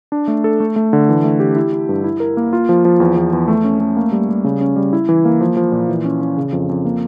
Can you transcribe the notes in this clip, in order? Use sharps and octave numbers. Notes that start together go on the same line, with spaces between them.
D4
A3
A4
A3
A3
D3
E3
A3
G4
E4
E4
G2
E4
A#4
A#3
F4
F3
F3
E2
E2
E2
A3
C#4
A3
A#3
G3
G3
C#3
C#4
G3
E4
E3
A#3
F3
F3
A#2
E3
C#4
C#4
C#3
F2
F2
A#3